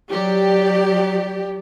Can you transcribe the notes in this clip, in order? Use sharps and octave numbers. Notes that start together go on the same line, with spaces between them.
F#3 G4 D5